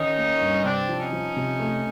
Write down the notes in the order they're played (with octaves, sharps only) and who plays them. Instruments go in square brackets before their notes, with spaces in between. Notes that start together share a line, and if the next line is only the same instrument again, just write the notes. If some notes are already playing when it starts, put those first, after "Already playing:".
Already playing: [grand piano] D#3 [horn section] C#4 D#4
[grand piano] A#3
G2
[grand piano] C3 [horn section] C4 D4
[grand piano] F3
[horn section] C#4 D#4
[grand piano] F3
C3
A3